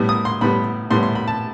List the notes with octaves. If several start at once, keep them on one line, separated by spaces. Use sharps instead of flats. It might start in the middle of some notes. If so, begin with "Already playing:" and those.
Already playing: A2 G3 B3
D#6
C6
A2 G3 B3 B5
A2 G3 B3 C6
C6
B5
A5